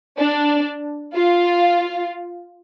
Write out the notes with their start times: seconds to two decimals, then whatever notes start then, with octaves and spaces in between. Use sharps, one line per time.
0.18 D4
1.15 F4